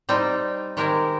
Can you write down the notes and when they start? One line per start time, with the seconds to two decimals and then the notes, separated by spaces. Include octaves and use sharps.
0.09 G3 C4 D#4
0.77 D#3 G#3 C4 G4 A#4